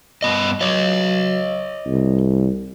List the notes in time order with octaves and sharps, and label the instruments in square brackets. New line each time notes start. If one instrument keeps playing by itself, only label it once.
[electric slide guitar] G2 B3 D#5
[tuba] F#3 [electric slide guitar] C#5 D#5
[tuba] C2